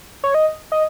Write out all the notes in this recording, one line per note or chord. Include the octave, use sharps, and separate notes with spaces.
C#5
D#5
D#5